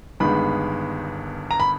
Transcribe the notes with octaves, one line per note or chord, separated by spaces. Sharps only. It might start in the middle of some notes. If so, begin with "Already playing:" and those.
G1 G2 D#3 G#3 B3 B5
A#5
B5